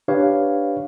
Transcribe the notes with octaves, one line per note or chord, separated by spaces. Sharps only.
D4 G4 B4 C#5 F5